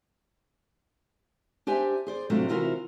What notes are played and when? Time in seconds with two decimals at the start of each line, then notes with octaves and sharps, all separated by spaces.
1.67 D4 G4 C5 E5 G#5
2.07 G#4 C5 D5
2.30 C3 F#3 A3 C4 D4 F4
2.48 C3 E3 F4 F#4 A#4 C5